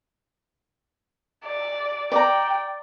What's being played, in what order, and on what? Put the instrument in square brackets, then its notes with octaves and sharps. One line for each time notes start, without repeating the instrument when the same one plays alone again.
[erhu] D5
[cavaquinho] D5 A#5 [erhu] G5